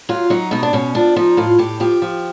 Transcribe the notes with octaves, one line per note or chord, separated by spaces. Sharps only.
F#3 F4
F#3 D#4
B2 D#4
D4
B2 C#4
F3 D4
F3 D#4
A2 F4
A2 G4
F3 G4
F3